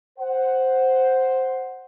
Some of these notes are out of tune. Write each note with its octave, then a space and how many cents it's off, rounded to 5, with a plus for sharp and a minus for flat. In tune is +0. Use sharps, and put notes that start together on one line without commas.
C5 +0 F#5 +0